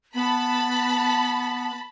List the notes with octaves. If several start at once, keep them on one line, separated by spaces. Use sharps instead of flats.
B3 A5 B5